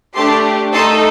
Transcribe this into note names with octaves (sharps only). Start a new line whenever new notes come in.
A3 D4 G4 A5 C6
A3 D#4 A4 A5 C6